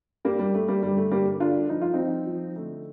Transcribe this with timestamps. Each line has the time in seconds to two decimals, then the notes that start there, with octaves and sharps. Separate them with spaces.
0.25 G2 G3 A#3
0.39 G3
0.54 G2 A3
0.68 G3 A#3
0.83 G1 G3
0.97 A3
1.11 G1 G3 A#3
1.40 D3 D4 F4
1.69 F3 D#4
1.82 F4
1.94 F3 C4 D#4
2.27 F3
2.56 D3 A3